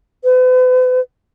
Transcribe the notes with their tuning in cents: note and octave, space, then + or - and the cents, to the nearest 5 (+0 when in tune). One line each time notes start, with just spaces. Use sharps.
B4 +45